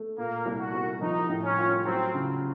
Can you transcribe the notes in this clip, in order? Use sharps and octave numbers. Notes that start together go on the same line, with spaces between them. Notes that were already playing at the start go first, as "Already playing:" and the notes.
Already playing: A3
A#2 A#3
C2
F#4
C2
F3 D#4
A2
C#4
F4
F#3 C4
C#3